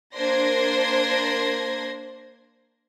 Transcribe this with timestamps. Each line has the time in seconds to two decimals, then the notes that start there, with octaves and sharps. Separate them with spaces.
0.16 A#3 D4 C5 C6 G#6 A#6